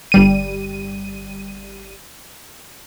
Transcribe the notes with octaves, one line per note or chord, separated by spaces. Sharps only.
G1 G3 D#7